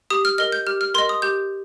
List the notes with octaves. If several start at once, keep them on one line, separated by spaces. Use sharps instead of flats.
G4 D#6
F6
A#4 D#5 F6
G6
G4 F6
F6
A#4 D#5 C6
D#6
G4 G6